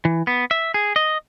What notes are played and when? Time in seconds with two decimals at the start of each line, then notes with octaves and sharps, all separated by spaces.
0.05 E3
0.27 B3
0.51 E5
0.74 G#4
0.96 D#5